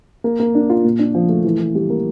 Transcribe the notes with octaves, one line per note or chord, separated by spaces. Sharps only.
A#3
A#3
D4
F4
A#2
D4
F3
A3
E3
E3
G3
A#3